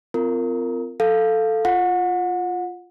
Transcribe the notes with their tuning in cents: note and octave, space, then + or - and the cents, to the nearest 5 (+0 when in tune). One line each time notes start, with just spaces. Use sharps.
C4 -30 F4 -20 A#4 -20
A4 +0 F5 +0
F4 +0 F#5 -30